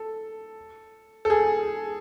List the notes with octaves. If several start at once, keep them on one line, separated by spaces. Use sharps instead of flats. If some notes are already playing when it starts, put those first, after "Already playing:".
Already playing: A4
A4
G#4